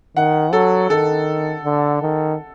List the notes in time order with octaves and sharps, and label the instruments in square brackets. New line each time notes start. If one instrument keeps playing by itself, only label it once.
[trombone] D#3 [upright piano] F#5
[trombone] F#3 [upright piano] A4
[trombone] D#3 [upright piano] A4
[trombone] D3
D#3